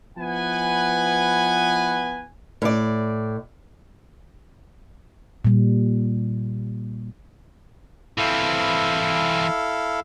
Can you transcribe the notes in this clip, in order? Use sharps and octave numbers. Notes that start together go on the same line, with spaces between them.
F3 B3 E4 B4 F#5 G#5
A2 D5
A#2 G3
E3 C4 E4 A4 F5